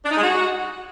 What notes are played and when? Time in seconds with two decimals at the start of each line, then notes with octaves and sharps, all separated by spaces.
0.05 D4
0.11 D#4
0.17 G#3
0.23 F#4